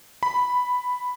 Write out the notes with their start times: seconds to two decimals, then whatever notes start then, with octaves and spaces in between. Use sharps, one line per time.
0.23 B5